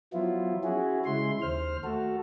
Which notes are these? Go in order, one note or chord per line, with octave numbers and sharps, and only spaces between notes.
F3 F#3 B3 E4 F4
C#4 E4 F#4 G#4
C#3 G#3 E4 C6
D#2 C5 F6
A3 F#4 A4